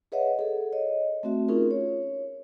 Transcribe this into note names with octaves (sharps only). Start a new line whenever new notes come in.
G#4 B4 C#5 D#5 E5 F#5
G#4 A4
C#5 D#5
A3 C4 F#4 E5
C#4 D#4 F4 G#4 A#4
C#5